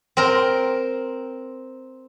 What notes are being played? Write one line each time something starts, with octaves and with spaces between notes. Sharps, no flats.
C4 A#4